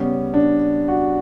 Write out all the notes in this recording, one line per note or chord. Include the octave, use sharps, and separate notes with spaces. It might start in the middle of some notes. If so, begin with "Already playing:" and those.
Already playing: C#3 G3 B3 C#4
D4
F#4